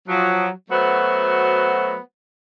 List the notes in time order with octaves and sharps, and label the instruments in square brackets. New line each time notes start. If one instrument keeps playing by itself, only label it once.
[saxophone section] F3 F#3
F#3 A3 B3 F#4 C5